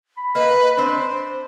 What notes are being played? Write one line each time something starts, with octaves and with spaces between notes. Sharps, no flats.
B5
A#3 B4 D#5
C4 D4 C5